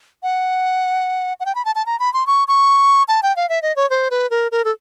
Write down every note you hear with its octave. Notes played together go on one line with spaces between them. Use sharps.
F#5
F#5
G5
B5
A5
A5
A#5
B5
C6
C#6
C#6
A5
G5
F5
E5
D#5
C#5
C5
B4
A#4
A#4
A4